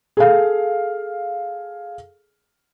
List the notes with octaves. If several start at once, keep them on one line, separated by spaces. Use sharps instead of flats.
G#4 A4 F5